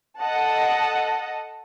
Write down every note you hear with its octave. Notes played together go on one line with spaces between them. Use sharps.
A4 D#5 F#5 A5